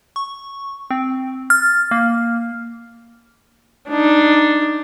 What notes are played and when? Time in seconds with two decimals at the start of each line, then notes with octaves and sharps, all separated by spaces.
0.16 C#6
0.90 C4
1.50 F6 A6
1.91 A#3
3.89 D4 D#4